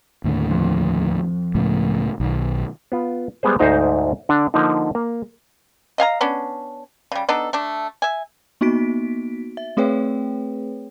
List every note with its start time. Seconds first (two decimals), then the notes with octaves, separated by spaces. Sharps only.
0.24 D#2 A2 D3
0.51 F2
1.55 C#2 A2 C#3
2.20 B1 D#3
2.92 B3 F4
3.43 G3 G#3 B3 G#4 C5
3.59 D2 G#2 D#4 C5 A#5
4.29 D3 D4
4.54 D3 F3 A#3 D#4
4.95 A#3
5.98 D#5 F5 G#5 A#5
6.21 B3 C#4 D4
7.12 C#3 G3
7.29 B3 D4 D#4 A4
7.53 A3 D4
8.02 E5 G#5
8.61 A#3 B3 D#4 F#4 B6 D7
9.57 E5
9.77 A3 C4 G#4 B4 C#5 G5